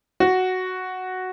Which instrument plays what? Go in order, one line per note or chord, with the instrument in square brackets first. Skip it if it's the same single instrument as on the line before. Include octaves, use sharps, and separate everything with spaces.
[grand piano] F#4